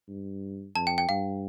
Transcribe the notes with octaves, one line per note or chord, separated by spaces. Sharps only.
G2
F2 A5
G5
G5
G2 F5